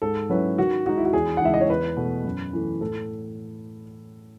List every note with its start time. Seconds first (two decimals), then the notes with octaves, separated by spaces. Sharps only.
0.02 G#2 A4
0.29 F#3 C#4 E4 B4
0.58 D#3 F#4
0.86 G#3 D#4 F#4
0.97 E4
1.05 F#4
1.13 E2 G#4
1.37 F#5
1.41 C#3 E3 G#3 D#4 E5
1.54 D#5
1.61 C#5
1.69 E2 B4
1.97 B2 A3
2.24 F#2
2.53 E3 A3
2.81 A2 A4